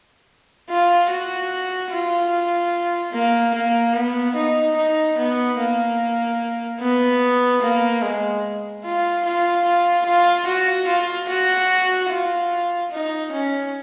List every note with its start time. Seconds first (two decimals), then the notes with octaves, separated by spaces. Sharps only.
0.69 F4
1.10 F#4
1.91 F4
3.13 A#3
3.54 A#3
3.94 B3
4.35 D#4
4.77 D#4
5.18 B3
5.58 A#3
6.81 B3
7.62 A#3
8.02 G#3
8.84 F4
9.25 F4
9.65 F4
10.05 F4
10.46 F#4
10.87 F4
11.29 F#4
12.10 F4
12.92 D#4
13.32 C#4